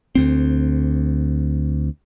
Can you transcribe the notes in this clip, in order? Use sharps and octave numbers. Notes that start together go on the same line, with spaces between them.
D2 C4